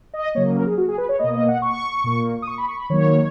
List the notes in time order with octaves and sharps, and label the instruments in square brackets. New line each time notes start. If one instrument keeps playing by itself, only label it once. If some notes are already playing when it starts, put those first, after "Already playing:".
[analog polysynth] D#5
C#3 F#3 A#3 C#5
A#4
G#4
F#4
G#4
B4
C#5
B2 A#3 D#5
D#5
F#5
C#6
A#2 A#3
D#6
C#6
B5
C#6
B5
D#3 F#3 A#3 C#5